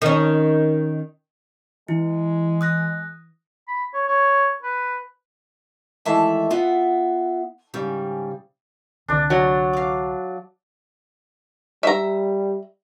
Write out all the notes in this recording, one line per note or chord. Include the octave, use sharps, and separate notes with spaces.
D#3 C#4
E3 G#3 E4
D#6 F#6 A#6
B5
C#5
C#5
B4
D#2 E3 G#3 A3 E5 A5
B3 F4 E5 F#5
G#2 C#3 G3
C2 D3 D4 D5
F#3
F5 D6
G3 E5 A#5